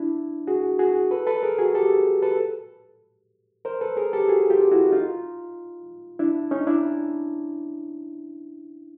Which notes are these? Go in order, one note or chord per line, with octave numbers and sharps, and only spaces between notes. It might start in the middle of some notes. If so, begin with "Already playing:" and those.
Already playing: D4 E4
F#4 G#4
F#4 G#4
A4 B4
A4 B4
G#4 A#4
F#4 G#4
G4 A4
A4 B4
A#4 C5
A4 B4
G#4 A#4
G4 A4
F#4 G#4
F4 G4
E4 F#4
D#4 F4
D4 E4
C#4 D#4
D4 E4